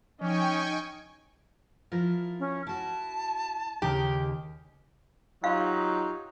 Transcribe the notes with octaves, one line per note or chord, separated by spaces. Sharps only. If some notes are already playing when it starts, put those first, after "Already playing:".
F3 C#4 D#4 D#5 G5 G#5 C#6 D6
F3 E4 F4 A#4 A#6
C#4
E4 F#4 A5
D#2 C#3 D#4 G4 A#4
F#3 D#4 F4 G4 F5